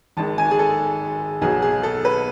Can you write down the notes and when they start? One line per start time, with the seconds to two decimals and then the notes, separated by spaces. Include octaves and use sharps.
0.17 G#1 G#2 D#3 A5
0.38 G#5
0.51 G#4
0.59 A4
1.41 B1 B2 F#3 B3 G#4
1.62 G#4
1.83 A4
2.05 B4